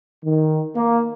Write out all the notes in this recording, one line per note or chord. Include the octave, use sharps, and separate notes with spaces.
D#3
A#3